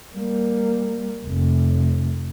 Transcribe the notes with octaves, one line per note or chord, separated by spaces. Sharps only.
G3 A#3
F1